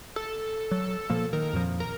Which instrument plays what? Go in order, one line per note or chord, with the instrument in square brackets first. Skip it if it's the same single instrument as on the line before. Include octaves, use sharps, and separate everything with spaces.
[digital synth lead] A4
[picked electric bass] F#3
A#2 F3 A#3
[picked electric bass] D#3 [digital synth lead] A#4
[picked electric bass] F2 A#2 F3
[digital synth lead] A#4